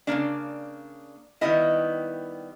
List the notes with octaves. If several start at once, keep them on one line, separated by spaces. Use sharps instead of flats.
C#3 F#3 A#3 D4 D5
D#3 G3 B3 E4 D#5